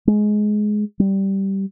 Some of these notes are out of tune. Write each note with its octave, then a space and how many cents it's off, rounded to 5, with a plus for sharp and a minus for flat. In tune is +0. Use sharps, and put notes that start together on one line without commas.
G#3 +15
G3 -10